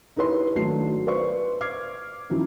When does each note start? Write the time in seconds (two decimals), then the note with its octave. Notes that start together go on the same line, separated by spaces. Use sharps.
0.16 D#4 E4 G4 B4 C#5 C6
0.55 G#1 F#3 A3 D4 F#4 C7
1.07 B4 C5 D5 C6 C#6
1.61 D6 F6 G#6 C7
2.30 F#2 F3 F#3 D#4 E4